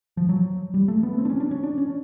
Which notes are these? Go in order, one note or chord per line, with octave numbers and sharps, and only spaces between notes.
F3
F#3
G3
A3
B3
C4
D4
C#4
D4
C#4
D4
C#4